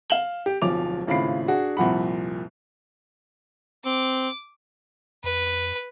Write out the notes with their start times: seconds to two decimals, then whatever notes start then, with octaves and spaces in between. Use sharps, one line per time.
0.10 F5 E7 F#7 G7
0.46 G4
0.62 D1 B1 F3 D6 F7
1.07 G#1 A2 C#3 F4 B5 C7
1.48 D4 F#4 G#4
1.77 C2 F2 A#2 F#5 B5
3.85 C4 D6
5.24 F2 B4